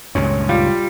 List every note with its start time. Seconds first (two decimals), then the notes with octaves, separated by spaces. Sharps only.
0.15 C#2 G2 A#2 C#4
0.49 G3 F4